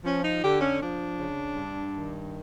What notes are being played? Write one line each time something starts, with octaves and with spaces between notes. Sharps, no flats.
F3 C#4
D#4
D3 G4
C#4
F3 D4
C#3
G2
D#3